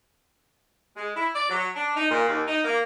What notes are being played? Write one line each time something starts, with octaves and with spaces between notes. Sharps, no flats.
G#3
E4
D5
F#3
D4
D#4
A#2
D#2
D#4
A#3